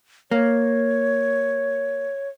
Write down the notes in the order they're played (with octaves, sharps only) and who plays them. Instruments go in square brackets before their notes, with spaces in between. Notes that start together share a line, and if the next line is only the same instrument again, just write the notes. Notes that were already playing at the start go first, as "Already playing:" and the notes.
[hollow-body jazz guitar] A#3 [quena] C#5